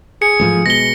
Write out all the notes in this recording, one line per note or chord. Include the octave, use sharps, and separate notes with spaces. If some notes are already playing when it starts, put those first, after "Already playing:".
G#4 C#7
A1 G#2 F3
B2 G#3 A#6 G7